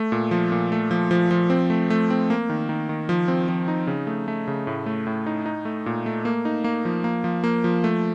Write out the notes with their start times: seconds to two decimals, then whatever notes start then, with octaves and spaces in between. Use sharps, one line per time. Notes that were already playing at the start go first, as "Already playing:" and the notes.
Already playing: A3
0.12 A#2
0.31 F3
0.52 A#2
0.72 A3
0.91 F3
1.11 F3
1.31 F3
1.50 C4
1.70 A3
1.90 A3
2.10 C4
2.30 A#3
2.49 D#3
2.69 D#3
2.89 D#3
3.09 F3
3.28 C4
3.49 F3
3.68 D#4
3.87 C#3
4.07 A3
4.28 A3
4.48 C#3
4.67 A2
4.86 A3
5.07 A2
5.26 D#4
5.46 D#4
5.65 A3
5.86 A#2
6.06 A3
6.25 A#3
6.45 D#4
6.64 A#3
6.85 F3
7.04 A#3
7.24 F3
7.44 A#3
7.64 F3
7.84 A3